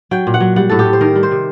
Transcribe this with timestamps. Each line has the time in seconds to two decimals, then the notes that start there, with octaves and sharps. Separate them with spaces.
0.11 F#3 G5
0.27 A#2
0.34 F#5
0.41 F#3
0.56 G3 F#5
0.70 A2 A4
0.79 G4
0.85 A2
0.93 C5
1.01 D#3 A#4
1.16 G3
1.23 C5
1.31 C3